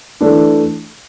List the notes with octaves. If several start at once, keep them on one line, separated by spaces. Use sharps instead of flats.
E3 A3 D4